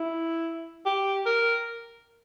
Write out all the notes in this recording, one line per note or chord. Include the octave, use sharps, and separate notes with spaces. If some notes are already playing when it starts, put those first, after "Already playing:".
Already playing: E4
G4
A#4